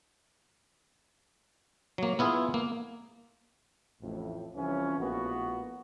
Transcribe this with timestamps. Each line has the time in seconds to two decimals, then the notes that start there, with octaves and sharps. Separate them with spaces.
1.98 F#3 A#3
2.19 B3 E4 F4 G#4
2.54 A#3
4.01 A1 F2 A2
4.55 C2 E3 F3 C#4
4.98 A#1 A2 A#3 B3 F#4